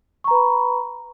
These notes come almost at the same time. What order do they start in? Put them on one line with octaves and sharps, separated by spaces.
C#6 A#5 B4 B5